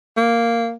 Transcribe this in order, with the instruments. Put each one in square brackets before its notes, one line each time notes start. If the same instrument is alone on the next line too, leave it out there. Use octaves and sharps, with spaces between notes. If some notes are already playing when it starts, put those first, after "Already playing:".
[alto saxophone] A#3